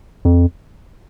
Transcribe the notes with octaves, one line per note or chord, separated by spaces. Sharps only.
F2